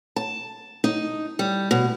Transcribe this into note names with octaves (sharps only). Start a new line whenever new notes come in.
A5
D#4
G3
B2